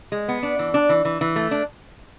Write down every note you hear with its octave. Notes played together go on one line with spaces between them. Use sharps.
G#3
B3
D4
E3
D4
E3
E3
E3
A3
D4